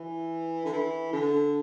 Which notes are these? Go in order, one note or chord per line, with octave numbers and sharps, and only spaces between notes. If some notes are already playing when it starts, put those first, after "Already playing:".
Already playing: E3
D3
E3
D3